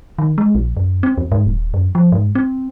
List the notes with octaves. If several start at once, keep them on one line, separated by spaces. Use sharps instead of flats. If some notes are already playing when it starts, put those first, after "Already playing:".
D#3
G#3
A#1
F#2
C4
E2
G#2
D#1
F#2
F3
G#2
C4